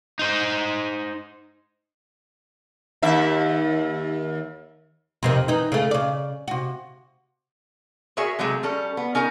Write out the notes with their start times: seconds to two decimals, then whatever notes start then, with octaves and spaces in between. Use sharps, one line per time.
0.19 D#4 C5
3.02 D#2 E5
5.23 F2 C3 D#3
5.48 E3 D#4
5.72 C#3 A3
5.91 C#3 D5
6.48 C3 F#4
8.17 F#4 G#4 A#4 C#5 E5 G#5
8.39 C3 F#3 G#3 A3
8.63 G3 C#4 A4
8.97 B3
9.15 C#4 D#4 A#4 G#5